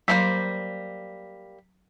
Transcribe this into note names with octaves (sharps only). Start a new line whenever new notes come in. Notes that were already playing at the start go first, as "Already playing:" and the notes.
F#3 G3 A#3 C5 B6